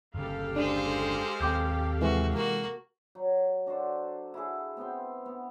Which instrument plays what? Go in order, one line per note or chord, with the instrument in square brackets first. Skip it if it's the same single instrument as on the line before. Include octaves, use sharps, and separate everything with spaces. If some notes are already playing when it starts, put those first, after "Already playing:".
[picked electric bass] G1 C#3 [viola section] G4 A4 F5
[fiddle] G#3 C5 [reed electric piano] D4
[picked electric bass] D#2 C4 [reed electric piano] G5 D6 G6
[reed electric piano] C3 E3 G#3 [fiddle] F#4
[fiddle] A#3 F#4
[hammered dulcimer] F#3
D4 F#4 A4 C5
E4 F#4 G#4
B3 C4 G5 C6
B3